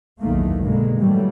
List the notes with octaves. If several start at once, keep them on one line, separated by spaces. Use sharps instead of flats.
F#1 B1 E2 D#3 A3 A#3
G2 B2 D3 G#3 A#3
A2 D3 E3 F#3 G3 A3